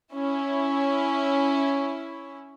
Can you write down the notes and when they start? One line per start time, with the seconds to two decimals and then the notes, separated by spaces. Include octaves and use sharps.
0.14 C#4 E4